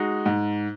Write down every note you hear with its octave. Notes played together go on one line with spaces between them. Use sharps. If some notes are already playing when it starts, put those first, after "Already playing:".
Already playing: G#3 D#4 F#4
G#2